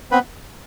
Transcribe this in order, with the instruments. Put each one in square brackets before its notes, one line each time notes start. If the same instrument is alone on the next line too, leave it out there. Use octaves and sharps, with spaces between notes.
[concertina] B3 C4 B4